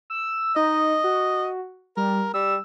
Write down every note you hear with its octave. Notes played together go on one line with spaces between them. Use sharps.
E6
D#4 D#5
F#4
G3 A#4
G3 E6